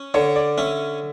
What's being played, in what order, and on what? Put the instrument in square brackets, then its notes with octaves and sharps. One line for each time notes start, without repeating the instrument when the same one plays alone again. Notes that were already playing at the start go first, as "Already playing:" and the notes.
Already playing: [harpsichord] C#4
[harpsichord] D3 [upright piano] C#5
[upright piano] D5
[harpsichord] C#4 [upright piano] E5